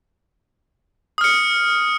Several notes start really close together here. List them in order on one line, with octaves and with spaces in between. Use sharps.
D#6 F6 C#7